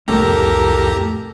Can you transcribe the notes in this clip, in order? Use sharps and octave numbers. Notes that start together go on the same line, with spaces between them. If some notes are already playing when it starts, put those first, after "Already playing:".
C2 F2 A2 G4 A4 A#4 A#5